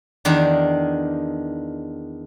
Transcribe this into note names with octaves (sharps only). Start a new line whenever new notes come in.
E2 D#3 D4